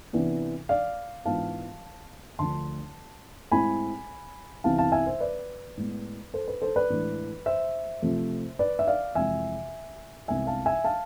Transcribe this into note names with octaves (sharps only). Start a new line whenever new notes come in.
C3 E3 B3 D4
D5 F5
G#2 E3 B3 D4 F4 F5 A5
D2 D3 F3 A3 D4 A5 C6
A2 G#3 C4 E4 G#5 B5
C2 C3 E3 B3 F5 A5
F5 A5
E5 G#5
C5 E5
B4 D5
A2 G#3 B3
A4 C5
B4
A4 C5
B4 D5
A2 E3 G#3 D4
C5 E5
C3 F3 A3
B4 D5
E5
D5 F5
F2 C3 E3 G#3 E5 G#5
C2 C3 G#3 B3 E5 G#5
F5 A5
E5 G#5
F5 A5